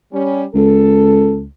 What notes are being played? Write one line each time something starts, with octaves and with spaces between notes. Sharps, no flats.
G3 C#4
C#2 A4